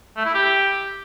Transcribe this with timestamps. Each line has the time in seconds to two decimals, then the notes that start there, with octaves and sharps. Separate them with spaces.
0.17 A3
0.25 E4
0.34 G4